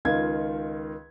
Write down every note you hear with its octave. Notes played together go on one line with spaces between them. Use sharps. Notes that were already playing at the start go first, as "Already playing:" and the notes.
C#2 D#3 F4 G#6